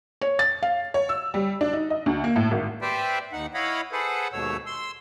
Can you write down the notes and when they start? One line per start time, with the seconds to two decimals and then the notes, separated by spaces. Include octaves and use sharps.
0.21 C#5
0.39 A6
0.63 F5
0.94 C#5
1.09 E6
1.34 G3
1.61 D4
1.73 D#4
1.90 D#5
2.06 D2
2.24 A#3
2.36 A2
2.51 G#1
2.82 G4 B4 C5 D5 E5 G5
3.33 D#2 D#4 F#5
3.54 E4 C#5 D#5 F5 F#5 B5
3.92 G#4 A4 B4 C5 F#5
4.33 D#2 G#2 B2 A3 C#5 E6
4.66 C6 E6